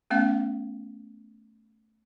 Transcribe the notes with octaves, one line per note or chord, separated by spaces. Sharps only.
A3 B3 C#4 F5